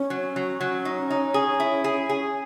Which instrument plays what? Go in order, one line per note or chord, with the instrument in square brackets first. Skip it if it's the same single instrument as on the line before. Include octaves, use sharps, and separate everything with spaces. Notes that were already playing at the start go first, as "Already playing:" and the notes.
Already playing: [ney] C#4
[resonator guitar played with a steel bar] F#3
F#3
F#3
D#4
D#4
G#4
E4
G#4
G#4